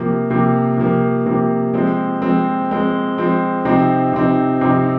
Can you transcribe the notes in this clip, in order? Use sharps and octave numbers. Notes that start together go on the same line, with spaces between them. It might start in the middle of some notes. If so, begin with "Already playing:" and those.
Already playing: C3 F3 A#3
C3 F3 A#3
C3 F3 A#3
C3 F3 A#3
F3 G#3 C4
F3 G#3 C4
F3 G#3 C4
F3 G#3 C4
C3 F3 C4 D#4
C3 F3 C4 D#4
C3 F3 C4 D#4